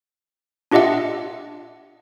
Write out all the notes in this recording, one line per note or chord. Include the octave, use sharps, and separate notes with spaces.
D4 F4 G4 D#5 E5 F#5